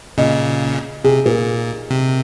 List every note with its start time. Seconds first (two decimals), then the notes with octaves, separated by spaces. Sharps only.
0.18 A#2 C#3 D#5
1.04 C3 G#4
1.26 A#2 A#4
1.90 C3